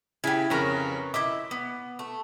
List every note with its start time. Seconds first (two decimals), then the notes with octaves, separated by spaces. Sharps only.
0.24 C#3 E4 G4 G#5 B6
0.50 F2 C#3 A#4 B4 C#5
1.14 E4 D#5 E5 D6
1.51 B3
1.99 A3